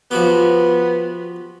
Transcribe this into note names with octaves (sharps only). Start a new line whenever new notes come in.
F3 B3 F#4 G4